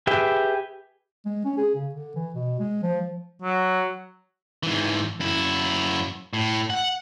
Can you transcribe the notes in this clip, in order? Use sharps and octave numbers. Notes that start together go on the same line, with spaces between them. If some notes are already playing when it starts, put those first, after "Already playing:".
G4 G#4 B4 E5 G5
G#3
C#4
G#4
C#3
D3
E3
B2
G#3
F3
F#3
G#2 E3
F#2 E4
A2
F#5